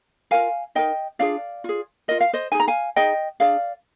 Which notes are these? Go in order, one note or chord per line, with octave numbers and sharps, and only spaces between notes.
F4 A#4 F5 G#5
D#4 A#4 D#5 G5
D4 F4 G#4 D5 F5
F4 G#4
F4 A#4 D#5
F5
C5 D#5
D#4 G#4 G#5
A#5
F5 G#5
D#4 G#4 D#5 G5
D4 G#4 D5 F5